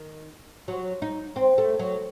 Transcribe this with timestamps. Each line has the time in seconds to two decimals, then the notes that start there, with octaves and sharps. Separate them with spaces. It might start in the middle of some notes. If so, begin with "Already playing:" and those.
Already playing: D#3
0.68 F#3
1.02 D#4
1.36 C4
1.58 A3
1.79 F#3